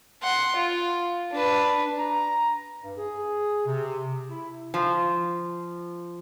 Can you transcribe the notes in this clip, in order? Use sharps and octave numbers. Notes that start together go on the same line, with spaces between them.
F#5 C6
F4
D4 B4
A#5
G2
G#4
C3
E4
F3